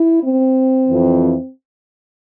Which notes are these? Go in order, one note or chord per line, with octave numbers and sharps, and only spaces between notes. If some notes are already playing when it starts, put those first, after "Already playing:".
Already playing: E4
C4
F2 E3